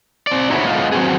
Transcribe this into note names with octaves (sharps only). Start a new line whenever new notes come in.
C4 D5
D#4 E4 F#4 G#4 B4 C#5
G#3 B3 F4
F#3 C4 F#4 G#4